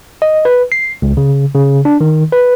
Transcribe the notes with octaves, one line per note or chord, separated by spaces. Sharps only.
D#5
B4
C7
C#2
C#3
C#3
D4
D#3
B4